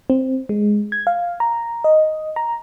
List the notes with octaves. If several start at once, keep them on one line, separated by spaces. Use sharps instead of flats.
C4
G#3
G#6
F5
A#5
D#5
A#5